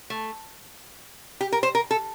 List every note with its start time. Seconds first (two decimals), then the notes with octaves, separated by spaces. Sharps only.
0.10 A3
1.41 G4
1.52 A#4
1.63 C5
1.75 A#4
1.91 A4